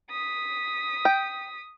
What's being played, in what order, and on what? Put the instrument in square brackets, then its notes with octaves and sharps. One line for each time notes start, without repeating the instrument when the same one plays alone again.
[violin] D#6 B6
[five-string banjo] G5